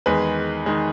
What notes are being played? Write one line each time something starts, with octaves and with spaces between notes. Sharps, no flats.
E2 D#3 G#3 B4
D#3 G#3